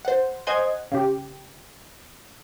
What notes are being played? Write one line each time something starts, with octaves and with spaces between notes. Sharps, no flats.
C5 F#5
C5 D#5 F#5 G#5 C6 G#6
C#3 G4